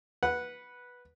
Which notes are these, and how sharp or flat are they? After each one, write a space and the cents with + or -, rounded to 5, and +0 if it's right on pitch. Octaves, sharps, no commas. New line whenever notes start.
B4 -10 F#5 -5